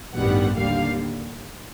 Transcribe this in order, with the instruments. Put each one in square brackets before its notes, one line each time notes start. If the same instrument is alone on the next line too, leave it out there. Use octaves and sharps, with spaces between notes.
[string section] A1 G2 D#3 G3 B3 F#5
D#2 D3 G3 A#3 F5